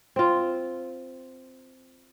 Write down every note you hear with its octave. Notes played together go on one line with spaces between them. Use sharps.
C4 F4